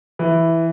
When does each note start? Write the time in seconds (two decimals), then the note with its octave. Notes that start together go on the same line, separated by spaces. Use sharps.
0.19 E3